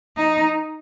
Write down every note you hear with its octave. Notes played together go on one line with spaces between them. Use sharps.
D#4